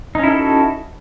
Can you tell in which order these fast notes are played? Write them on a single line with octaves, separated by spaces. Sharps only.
D#4 C#4 E4 A4 F#4